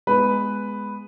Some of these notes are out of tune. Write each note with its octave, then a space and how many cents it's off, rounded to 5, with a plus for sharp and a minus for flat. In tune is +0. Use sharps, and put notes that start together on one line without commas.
G#3 +0 B3 +0 B4 +0